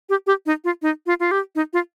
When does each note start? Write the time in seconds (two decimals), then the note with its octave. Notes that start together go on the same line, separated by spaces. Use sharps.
0.09 G4
0.27 G4
0.46 D#4
0.64 F4
0.82 D#4
1.06 F4
1.20 F4
1.31 G4
1.55 D#4
1.73 F4